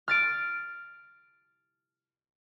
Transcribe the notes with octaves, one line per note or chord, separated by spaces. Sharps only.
F6 A6 D7